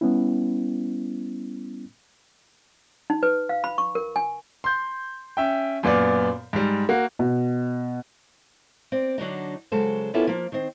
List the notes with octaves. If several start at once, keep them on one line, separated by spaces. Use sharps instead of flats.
G3 B3 C#4 E4
D#4
B4
F5
B5
C#6
A#4
G#5
C6 G6
C#4 E5 G5
F#2 A#2 B3 D5
G#2 G3
A#3 F#4
B2
C4 D5
D3 F#3 D4 D#4
C#3 F#3 G#3 A4 C5
A#3 B3 C#4 E4 F4 A4
F3 A#3
D#3 C4